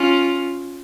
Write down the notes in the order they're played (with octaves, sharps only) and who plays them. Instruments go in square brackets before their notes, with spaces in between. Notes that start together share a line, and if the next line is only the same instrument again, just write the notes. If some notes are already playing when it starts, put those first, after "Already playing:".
Already playing: [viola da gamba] C#4 F4